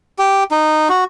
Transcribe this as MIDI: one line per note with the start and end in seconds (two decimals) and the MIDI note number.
0.19 0.44 67
0.51 0.88 63
0.89 1.04 66